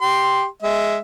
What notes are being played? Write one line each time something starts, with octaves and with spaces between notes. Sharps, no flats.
G4 C6
G#3 E5